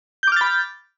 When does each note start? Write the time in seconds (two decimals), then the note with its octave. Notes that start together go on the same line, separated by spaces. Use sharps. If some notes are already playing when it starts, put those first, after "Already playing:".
0.23 G6
0.27 D6
0.32 F6
0.36 A6
0.41 B5